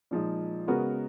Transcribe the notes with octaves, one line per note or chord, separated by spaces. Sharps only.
A#2 F3 G#3 D#4
C#3 G#3 B3 F#4 A#4